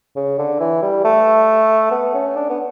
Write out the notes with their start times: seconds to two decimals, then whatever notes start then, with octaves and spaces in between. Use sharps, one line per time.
0.16 C#3
0.38 D3
0.60 E3
0.82 G3
1.04 A3
1.91 B3
2.14 C#4
2.36 D4
2.49 B3